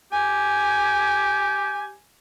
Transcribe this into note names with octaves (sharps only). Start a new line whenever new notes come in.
G4 G#5